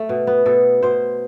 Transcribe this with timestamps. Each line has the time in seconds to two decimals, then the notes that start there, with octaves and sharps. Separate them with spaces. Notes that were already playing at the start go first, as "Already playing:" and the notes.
Already playing: A3
0.09 B2
0.27 B3
0.46 B2 A4
0.82 B2 C5